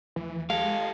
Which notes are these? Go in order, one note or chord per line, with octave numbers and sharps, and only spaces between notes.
D#2 E3 F3 A3
G#3 G4 A4 F5